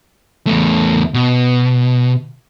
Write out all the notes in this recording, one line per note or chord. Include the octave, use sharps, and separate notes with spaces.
E2 A3
B2